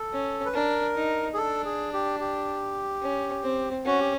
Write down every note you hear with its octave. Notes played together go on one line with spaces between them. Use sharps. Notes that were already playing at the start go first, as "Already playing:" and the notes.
Already playing: A4
C#4
B4
D4 A#4
D#4
G#4
D4 A4
G#4
G4
G4
C#4
C4
C#4 F#4
G4